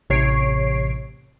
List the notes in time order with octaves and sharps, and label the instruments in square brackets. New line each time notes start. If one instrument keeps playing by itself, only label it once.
[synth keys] A1 C3 C#5 C7 D7